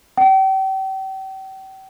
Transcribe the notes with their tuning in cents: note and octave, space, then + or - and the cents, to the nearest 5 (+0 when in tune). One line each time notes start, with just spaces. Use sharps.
G5 -35